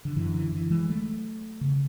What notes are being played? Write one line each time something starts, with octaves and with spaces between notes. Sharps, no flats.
D3
F#2 D3 E3
E3
E3
E3 G#3
F#3 A3
C#3